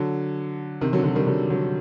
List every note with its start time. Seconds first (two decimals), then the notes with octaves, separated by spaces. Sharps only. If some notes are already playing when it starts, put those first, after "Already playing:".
Already playing: D3 F#3
0.81 C3 D#3
0.93 D3 F#3
1.04 D3 F#3
1.15 D#3 G3
1.27 D3 F#3
1.50 D3 F#3